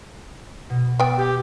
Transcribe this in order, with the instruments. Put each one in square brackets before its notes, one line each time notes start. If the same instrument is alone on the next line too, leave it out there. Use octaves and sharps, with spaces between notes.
[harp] B2
[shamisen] B3 G5 [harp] D5 E6
[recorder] G4